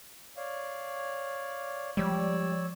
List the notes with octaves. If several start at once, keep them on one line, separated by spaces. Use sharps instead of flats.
C#5 D5 F5
F3 G3 G#3 C#5 D5 E6